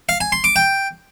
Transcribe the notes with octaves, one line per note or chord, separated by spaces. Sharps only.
F5
G#5
C6
D6
G5